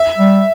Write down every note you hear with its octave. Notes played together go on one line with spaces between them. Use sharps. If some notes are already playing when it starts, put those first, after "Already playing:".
Already playing: E5
G3